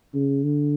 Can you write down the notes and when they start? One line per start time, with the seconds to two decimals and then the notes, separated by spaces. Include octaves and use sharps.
0.14 C#3
0.43 D3